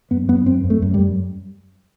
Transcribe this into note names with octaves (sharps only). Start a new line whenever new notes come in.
F#2 B3
F#2 B3
F#2 C4
F#2
A3
F#2
G3
F#2